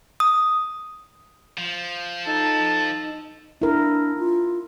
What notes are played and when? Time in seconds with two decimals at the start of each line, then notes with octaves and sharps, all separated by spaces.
0.20 D#6
1.58 F3
2.26 D#4 A4
3.62 D4 E4 A#4
4.18 F4